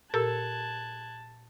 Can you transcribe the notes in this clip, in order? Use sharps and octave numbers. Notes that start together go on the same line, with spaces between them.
A#2 G4 A4 A#4 A5 E6 F#6 G#6